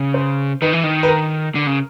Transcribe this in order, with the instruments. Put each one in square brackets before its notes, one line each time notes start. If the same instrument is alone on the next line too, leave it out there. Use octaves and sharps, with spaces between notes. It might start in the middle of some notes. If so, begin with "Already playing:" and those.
Already playing: [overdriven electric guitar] C#3
[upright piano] C5
[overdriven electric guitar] D#3 [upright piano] B4
[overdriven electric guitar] E3
D#3
[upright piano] B4
A#4
[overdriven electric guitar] D3
C#3